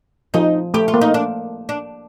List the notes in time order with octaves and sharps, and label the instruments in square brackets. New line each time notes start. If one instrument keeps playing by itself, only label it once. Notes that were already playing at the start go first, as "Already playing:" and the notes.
[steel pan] F3 [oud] D#4
[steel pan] A3 [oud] G4
[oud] F4
[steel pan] A#3
[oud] D#4
D4
D4